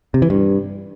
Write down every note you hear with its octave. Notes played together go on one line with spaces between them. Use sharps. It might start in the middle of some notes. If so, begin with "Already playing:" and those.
C3
E3
G2